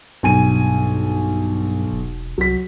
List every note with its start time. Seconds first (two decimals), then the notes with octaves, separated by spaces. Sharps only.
0.23 B1 G2 G#5 D#7
1.92 E1
2.38 C2 F#3 B6